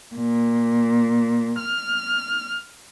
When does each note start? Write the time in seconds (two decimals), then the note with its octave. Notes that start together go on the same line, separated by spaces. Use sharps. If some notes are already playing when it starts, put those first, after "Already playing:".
0.16 A#2
1.61 F6